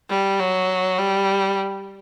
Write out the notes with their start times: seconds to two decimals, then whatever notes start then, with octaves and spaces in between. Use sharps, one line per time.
0.09 G3
0.39 F#3
0.99 G3